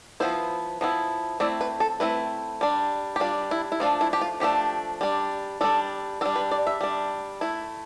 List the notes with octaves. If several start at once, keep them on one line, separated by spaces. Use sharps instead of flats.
F3 B3 E4 C5
F3 B3 E4
A3 C4 E4 D5
B4
A4
A3 C4 E4 B4
G3 D4
G4
G3 D4 F4
E4
E4
F3 A3 D4 F4
E4
G4
F4
F3 A3 D4 G4
G3 D4
G3 D4 A4
G3 D4 A4
B4
D5
E5
G3 D4
A3 E4